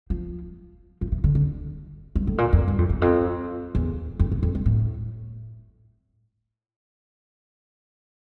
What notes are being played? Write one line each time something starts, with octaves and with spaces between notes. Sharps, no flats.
F3
F3
E3
D3
D3
G2
A2
A#2
F2
G2
F2
E2
F2
E2
F2
E2
F2
G2
A2